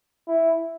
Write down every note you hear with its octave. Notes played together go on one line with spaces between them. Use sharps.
E4